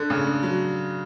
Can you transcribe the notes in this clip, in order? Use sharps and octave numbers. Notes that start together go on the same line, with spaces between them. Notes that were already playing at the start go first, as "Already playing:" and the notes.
Already playing: D3
C#3
D3
F#3